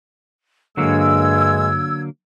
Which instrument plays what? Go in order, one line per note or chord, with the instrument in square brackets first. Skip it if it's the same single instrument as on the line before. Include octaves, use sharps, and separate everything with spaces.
[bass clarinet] G2 [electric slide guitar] D3 F#3 A#3 [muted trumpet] G#3 [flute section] E6 G#6